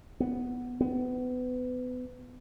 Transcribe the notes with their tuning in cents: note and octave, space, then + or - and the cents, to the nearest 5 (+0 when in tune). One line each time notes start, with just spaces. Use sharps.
B3 +0
B3 +30